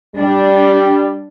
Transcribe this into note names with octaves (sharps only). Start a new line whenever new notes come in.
G3 D4